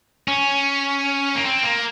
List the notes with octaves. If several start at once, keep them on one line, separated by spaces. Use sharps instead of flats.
C#4
A#3
C4
A#3